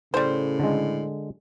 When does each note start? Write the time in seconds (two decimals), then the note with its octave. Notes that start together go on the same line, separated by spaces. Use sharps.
0.14 A2 C#3 G3 C5
0.60 D3 G#3